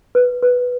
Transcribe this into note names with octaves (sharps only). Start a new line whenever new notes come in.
B4
B4